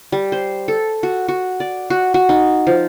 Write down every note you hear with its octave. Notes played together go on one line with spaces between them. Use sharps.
G3
C5
A4
F#4
F#4
D5
F#4
F#4
D#4
F3